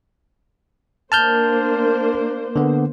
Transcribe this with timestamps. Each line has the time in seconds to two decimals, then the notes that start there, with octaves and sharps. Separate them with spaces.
1.12 A#3 D4 C5 A5 F6 G6
2.56 D3 B3